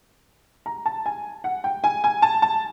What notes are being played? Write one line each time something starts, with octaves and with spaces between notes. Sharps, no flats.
A#5
A5
G#5
F#5
G5
G#5
G#5
A5
A5